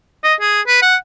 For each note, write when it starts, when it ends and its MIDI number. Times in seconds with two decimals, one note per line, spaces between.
0.24 0.34 75
0.40 0.61 68
0.67 0.78 71
0.82 0.96 78